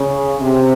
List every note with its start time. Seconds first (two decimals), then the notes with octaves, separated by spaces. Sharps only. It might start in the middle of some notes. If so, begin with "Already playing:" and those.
Already playing: C#3
0.41 C3